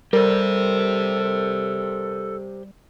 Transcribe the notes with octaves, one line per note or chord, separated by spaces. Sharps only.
G3 G4 A4 A#4 C5